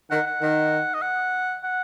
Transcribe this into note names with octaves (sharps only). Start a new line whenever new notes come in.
D#3 F#5
F#5
D#3
D#5
F#5
F#5